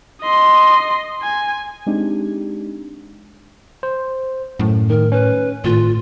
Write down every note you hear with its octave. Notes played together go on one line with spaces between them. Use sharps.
D#5 C6
G#5
G#3 C4 D4 D#4 G4
C5
F#2 A2
D#3 A#4
C#4 B4
G#1 A2 F4